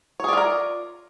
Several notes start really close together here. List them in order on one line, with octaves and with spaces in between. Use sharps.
C#5 G#4 D5 F4 A#4